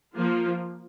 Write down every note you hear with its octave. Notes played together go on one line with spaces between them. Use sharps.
F3 A#3 F4